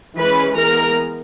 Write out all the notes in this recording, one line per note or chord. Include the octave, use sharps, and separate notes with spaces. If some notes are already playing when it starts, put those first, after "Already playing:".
E3 G#3 C#4 B4 B5
E3 G#3 B3 A#4 A#5